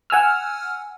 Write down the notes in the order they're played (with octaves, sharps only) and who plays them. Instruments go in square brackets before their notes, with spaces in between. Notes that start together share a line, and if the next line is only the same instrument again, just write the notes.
[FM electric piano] F#5 G#5 E6 F6